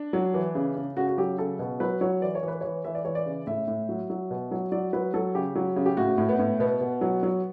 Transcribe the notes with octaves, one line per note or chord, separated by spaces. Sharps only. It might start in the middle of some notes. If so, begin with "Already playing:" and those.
Already playing: D4
F#3
E3
C#3
C#3
C#3 F#4
F#4
F#3 G4
C#3 A4
B2
F#3 B4
F#3 C#5
E3 D5
C#5
E3
B4
E3 C#5
E3 E5
D5
E3 C#5
D5
C#3
A2 E5
A2
F#3
F#3
B2
F#3
F#3 D5
F#3 B4
F#3 A4
C#3 G4
F#3
C#3
G4
A2 F#4
A2
B3
A2
B2 B3
B2
F#3
F#3